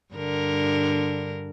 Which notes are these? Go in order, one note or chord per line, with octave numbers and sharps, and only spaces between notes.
G2 D3 A#4